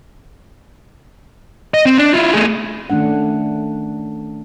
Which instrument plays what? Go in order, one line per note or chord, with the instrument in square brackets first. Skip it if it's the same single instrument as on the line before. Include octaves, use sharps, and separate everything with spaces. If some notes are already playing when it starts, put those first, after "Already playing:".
[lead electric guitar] D#5
C4
D4
E4 F4
A3 G#4
[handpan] D#3 A3 C#4 D4 F#5